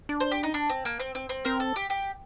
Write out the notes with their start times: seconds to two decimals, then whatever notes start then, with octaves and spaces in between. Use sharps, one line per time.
0.09 D4
0.20 C5
0.31 G4
0.43 D#4
0.54 D4
0.69 C4
0.85 A#3
0.99 C4
1.15 C4
1.29 C4
1.45 C4 A#4
1.60 A4
1.76 G4
1.90 G4